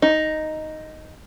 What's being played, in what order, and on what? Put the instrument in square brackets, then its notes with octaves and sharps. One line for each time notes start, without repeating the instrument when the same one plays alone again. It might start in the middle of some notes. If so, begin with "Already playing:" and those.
[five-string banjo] D#4